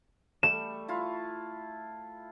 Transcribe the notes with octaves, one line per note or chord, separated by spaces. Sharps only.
G3 A3 E7
E4 F4